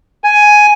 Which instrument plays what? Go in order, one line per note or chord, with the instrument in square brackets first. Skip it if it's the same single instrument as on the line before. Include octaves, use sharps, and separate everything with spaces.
[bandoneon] G#5